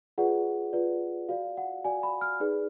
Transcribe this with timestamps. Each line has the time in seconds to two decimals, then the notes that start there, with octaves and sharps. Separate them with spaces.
0.18 F4 G#4 B4 D5 F#5
0.73 F4 G#4 B4 D5
1.29 F#4 D5 F5
1.57 F#5
1.85 F#4 D5 G#5
2.03 B5
2.21 F6
2.40 D#4 G#4 B4 D5